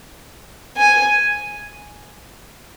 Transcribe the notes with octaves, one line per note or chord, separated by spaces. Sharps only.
G#5